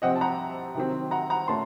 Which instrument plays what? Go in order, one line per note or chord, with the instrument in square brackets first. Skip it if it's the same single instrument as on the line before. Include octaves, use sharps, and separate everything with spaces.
[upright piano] C3 F3 C4 D#5 F#5
A5
F#5 A#5
C3 D#3 F#3 C4
F#5 A#5
F#5 A#5
A#2 A3 C#4 A5 C6